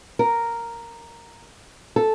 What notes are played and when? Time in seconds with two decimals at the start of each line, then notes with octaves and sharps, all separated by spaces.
0.19 A#4
1.96 A4